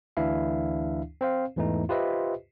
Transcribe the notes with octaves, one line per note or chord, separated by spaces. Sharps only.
D2 E3 D4 E4 E5 F5
C4 C5 F5
E2 G#2 E3 A3 D#4
F4 G4 B4 C5 D#5 E5